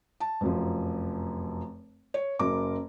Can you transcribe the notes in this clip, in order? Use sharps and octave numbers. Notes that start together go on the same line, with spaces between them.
A5
F1 F#2 F3
C#5
F#1 F#2 A#4 D6